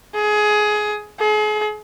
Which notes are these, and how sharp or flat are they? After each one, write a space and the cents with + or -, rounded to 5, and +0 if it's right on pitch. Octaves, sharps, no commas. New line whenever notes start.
G#4 +20
G#4 +40